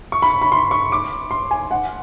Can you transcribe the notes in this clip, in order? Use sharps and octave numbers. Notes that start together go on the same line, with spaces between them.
C#6
B5
B5
C6
C#6
D6
C6
G#5
F#5